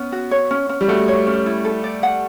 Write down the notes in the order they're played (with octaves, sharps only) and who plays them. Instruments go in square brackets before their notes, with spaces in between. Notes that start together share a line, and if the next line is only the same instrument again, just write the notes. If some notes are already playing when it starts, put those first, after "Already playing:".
Already playing: [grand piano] B3 [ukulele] C#4
[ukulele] F#4
C#5
C#4
C#4
[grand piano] G3
[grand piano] A3 [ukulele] F#4
[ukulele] C#5
C#4
E4
A4
D5
F#5